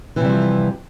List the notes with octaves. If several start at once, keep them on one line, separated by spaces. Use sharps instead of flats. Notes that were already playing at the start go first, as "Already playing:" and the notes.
C3 E3 F3 G3